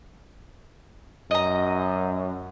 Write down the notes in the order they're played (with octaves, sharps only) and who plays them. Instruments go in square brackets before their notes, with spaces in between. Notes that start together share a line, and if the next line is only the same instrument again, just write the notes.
[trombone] F#2 [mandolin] D#5 A#5